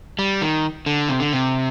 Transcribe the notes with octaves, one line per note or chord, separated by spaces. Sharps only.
G3
D#3
D3
C3
D3
C3